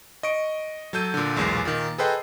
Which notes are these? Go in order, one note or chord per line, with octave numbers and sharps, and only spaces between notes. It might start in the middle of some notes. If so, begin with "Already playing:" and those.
D#5 C#6 D7
F#3 A4 G6 D#7
A#2 D3
B1 E2 A#2 G#3 A#6 C7
A#2 D#3
G#4 A4 B4 C5 D#5 G5